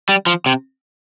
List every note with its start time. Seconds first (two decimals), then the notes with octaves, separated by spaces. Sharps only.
0.09 G3
0.26 F3
0.46 C3